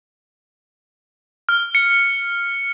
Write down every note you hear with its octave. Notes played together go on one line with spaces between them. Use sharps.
F6
C#7